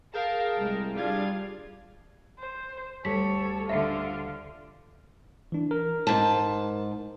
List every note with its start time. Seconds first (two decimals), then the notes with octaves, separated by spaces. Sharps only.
0.14 G#4 A#4 F5 G5 A5
0.58 C2 G#3
0.96 G3 D4 F4 F5 G#6
2.39 C5
3.05 D2 G3 A4 C#5 B6
3.69 D3 F4 E5
5.52 E3 D4
5.71 A#4
6.07 G#2 A5